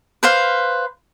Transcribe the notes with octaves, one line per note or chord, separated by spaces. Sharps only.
B4 C5 F5